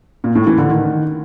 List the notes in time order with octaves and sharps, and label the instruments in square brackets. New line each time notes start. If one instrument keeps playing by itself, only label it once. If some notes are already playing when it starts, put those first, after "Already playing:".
[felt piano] A#2
A2
E3
D3
D#3